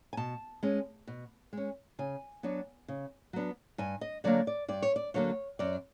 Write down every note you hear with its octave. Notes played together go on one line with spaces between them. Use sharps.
G#5
B2 A5
G#3 C#4
B2
G#3 C#4
C#3 G#5
F#3 B3 D4
C#3
F#3 B3 D4
G2 G#5
D#5
D3 F#3 A#3 D5
D5
G2 D5
C#5
D5
D3 F#3 A#3 C#5
F#2 D5